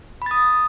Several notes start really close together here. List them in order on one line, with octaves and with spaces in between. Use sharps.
B5 A6 D#6